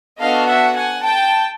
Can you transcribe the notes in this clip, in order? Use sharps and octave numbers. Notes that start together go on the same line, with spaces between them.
B3 D4 F#4 A4 D#5 F5
E5 F#5
F#5 G#5
G5 A5